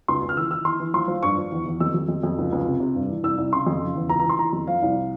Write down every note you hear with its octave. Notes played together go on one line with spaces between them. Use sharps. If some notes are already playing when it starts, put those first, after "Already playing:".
C#2 C6
C#2
F6
E3 E6
E3 E6
E3 C6
E3
F3 C6
F3
G2 C#6
F3
E2
E2
F2 E6
F2
F2
F2
C#2
C#2
C3
C3
G2
E3
C2 E6
C2
C#3 C6
F2
C#3
E2
C#2 A#5
A#5
E3
C6
E3 A#5
F2
F3 F5
C2